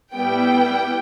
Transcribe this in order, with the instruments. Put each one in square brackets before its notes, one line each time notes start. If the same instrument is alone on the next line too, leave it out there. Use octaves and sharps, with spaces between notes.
[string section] A2 G3 B3 E4 G5